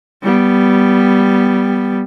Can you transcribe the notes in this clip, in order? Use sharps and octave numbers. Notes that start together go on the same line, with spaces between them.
G3 B3